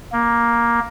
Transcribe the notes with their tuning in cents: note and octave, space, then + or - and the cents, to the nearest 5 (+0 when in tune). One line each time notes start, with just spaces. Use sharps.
A#3 +10